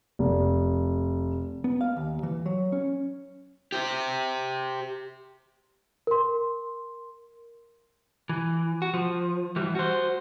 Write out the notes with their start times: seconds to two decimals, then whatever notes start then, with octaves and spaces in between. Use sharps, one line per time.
0.19 F1
1.64 B3
1.81 F5
1.97 D#2
2.23 E3
2.46 F#3
2.72 C#4
3.72 G4 C5
6.07 A#4 C6
8.29 E3
8.82 F#4
8.94 F3
9.56 E3 G3
9.75 F#4 C5